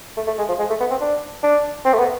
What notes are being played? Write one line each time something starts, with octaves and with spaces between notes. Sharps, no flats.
A3
A3
G#3
F3
G#3
A3
B3
C4
D4
D4
C4
A3
B3